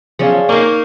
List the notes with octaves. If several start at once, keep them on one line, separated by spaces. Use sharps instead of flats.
F3 F#3 C#4 G#4 D5 F5
A#3 D#4 D5 C#6